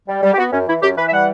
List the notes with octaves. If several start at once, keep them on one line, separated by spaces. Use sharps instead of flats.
G3
G3
G4
B3 F#4
F#2 C#4
E3 E4
F#2 G4
E3 B4
E5
G3 F#5